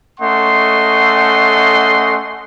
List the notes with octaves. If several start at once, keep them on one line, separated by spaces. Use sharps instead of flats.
A3 C#4 D#5 F#5 C6